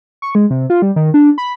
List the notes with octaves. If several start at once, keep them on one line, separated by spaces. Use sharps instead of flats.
C#6
G#3
C3
F4
G3
D#3
D4
B5